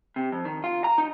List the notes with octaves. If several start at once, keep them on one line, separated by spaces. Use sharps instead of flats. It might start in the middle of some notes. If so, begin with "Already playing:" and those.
C3
F2
D#3
F4
A#5
D#4